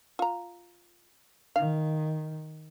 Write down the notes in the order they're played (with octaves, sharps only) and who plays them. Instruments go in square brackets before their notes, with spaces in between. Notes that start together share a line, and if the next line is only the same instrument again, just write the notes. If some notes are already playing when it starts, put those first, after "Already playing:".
[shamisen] F4 A#5
[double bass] D#3 [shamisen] F5